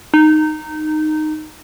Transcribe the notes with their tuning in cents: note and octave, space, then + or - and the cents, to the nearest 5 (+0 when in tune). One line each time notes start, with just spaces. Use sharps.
D#4 -15